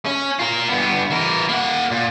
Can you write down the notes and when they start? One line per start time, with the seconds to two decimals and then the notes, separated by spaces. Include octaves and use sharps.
0.06 C#4
0.39 F4 A#4
0.69 G2 B3
1.10 E3 A#4
1.49 A#3 F#5
1.91 A#2